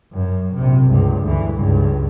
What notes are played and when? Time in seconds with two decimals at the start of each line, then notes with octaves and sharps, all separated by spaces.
0.13 F#2
0.54 A#1 C3
0.89 C#2 G2
1.23 D2 E3
1.54 C#2 G2